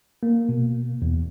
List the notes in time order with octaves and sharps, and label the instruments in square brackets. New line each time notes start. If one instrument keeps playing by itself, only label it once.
[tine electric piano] A#3
B2
E2